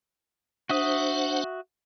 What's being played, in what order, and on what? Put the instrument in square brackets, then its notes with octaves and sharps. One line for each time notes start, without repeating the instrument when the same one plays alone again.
[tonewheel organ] D4 C5 F#5 [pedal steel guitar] F#4 E5 D#6